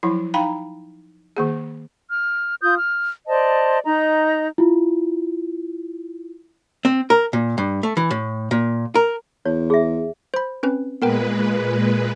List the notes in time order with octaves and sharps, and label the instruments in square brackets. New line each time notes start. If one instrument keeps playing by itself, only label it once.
[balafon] F3 F#3 E4
D#4 F5 G5 A#5 B5
D#3 A#3 G#4
[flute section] F6
F4 D#6 G6
F6
C5 D5 D#5 A5
D#4 D#5 A#5
[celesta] E4 F4
[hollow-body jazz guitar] C4
A#4
A#2
G2
A3
E3
A2
A#2
A#4
[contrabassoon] E2 [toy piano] C#5
[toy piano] G#4 E5
[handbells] C5 B5
C4 C#4 B4
[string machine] A#2 G#3 B4 [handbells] B3 A#4 G5